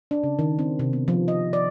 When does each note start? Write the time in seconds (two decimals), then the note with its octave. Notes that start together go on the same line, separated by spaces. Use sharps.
0.11 D4
0.23 C#3
0.39 D#3
0.59 C4
0.79 C3
0.93 B3
1.08 F3
1.28 D#5
1.53 D5